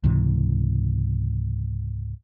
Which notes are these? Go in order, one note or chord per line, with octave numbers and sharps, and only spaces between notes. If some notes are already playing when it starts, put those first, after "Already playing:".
C#2 G#2 C3 E3